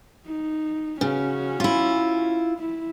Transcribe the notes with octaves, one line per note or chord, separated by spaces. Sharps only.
D#4
C#3 C#4 F#4
E4 F4
E4